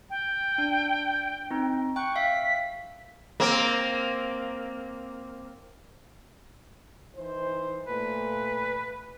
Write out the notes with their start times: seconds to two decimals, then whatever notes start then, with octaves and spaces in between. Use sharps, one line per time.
0.10 G5
0.58 D4
1.51 C4 D#4
1.96 G5 C#6 F#6
2.16 E5 F5 B6
3.40 A#3 C4
7.15 E3 D#4 C5
7.87 A#2 A3 B4